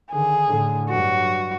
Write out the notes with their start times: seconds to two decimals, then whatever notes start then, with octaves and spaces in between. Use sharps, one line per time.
0.11 D3 D#3 G#4
0.47 A2 D3
0.90 G2 F#3 F#4